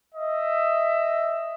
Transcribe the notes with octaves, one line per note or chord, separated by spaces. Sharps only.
D#5 E5